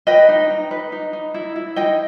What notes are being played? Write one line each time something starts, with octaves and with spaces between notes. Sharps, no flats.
B4 D#5 G5
D#4
D#4
B4
D#4
D#4
E4
E4
D#4 D#5 G5